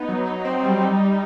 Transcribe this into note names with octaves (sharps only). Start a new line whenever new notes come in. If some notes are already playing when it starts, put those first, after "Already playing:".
Already playing: B3 D#4
F#3
D#4
C4
G3
D#4
G3